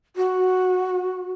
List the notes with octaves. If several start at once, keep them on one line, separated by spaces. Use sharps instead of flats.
F#4